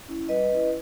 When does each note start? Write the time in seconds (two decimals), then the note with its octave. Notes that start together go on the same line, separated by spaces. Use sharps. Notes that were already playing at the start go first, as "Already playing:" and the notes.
0.08 C#4 E4
0.29 G3 B4 D#5
0.51 C#4 E4